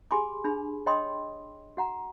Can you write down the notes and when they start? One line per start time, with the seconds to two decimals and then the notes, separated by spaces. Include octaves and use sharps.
0.11 G4 G#4 G#5 B5 C6 D6
0.44 D4 G#4 B5
0.86 C#5 D#5 G5 B5 C6 D#6
1.77 F#4 F#5 A#5